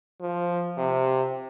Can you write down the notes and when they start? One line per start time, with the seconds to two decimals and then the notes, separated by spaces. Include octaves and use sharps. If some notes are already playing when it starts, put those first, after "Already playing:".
0.21 F3
0.77 C3